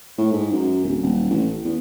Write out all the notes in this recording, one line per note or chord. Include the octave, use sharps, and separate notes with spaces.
A2
G#2
F#2
D1
D#1
A1
E2